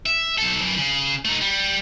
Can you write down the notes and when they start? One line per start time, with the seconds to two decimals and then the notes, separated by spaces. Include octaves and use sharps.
0.06 E5
0.38 B1 A4
0.60 F#2 E3
0.77 C#3
1.25 A3 D#4
1.41 G3